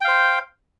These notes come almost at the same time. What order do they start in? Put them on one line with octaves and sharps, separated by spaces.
G5 F5 C5